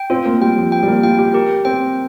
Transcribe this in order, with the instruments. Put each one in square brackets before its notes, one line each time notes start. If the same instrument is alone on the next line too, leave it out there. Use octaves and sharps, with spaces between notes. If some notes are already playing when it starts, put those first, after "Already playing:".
Already playing: [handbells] G5
[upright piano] C4 [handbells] F4
[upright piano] A#3
[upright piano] G3 [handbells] G5
[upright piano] F3
[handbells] G5
[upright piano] G3
A#3
[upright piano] F4 [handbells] G5
[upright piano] G4
[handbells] G4 [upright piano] A#4
[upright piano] C4 [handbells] G5